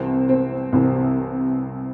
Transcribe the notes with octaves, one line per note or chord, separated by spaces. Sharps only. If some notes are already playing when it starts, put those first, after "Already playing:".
Already playing: C2 C3 E3 C4
C4
C2 C3 E3